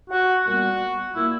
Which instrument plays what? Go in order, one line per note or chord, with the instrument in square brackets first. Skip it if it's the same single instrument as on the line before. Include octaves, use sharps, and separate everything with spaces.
[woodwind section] F#4
A#2 G3 B3 F#4
A#2 A#3 E4